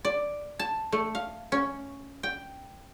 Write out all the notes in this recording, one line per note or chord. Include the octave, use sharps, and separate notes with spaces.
D5
A5
A3
F5
C#4
G5